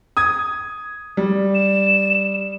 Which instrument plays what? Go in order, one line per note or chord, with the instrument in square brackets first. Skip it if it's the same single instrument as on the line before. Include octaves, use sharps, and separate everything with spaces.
[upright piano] D#6 G#6
G3
[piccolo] E7